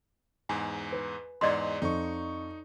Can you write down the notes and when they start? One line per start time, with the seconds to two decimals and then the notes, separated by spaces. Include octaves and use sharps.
0.49 E2 G#2 G#5
0.92 B4
1.41 E2 G#2 D5 D#5 C6
1.82 F2 D#4 C#6